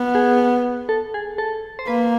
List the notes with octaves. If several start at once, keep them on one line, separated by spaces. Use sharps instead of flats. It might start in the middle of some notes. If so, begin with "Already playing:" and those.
Already playing: B3
G#4
A4
G#4
A4
C5
A#3 B4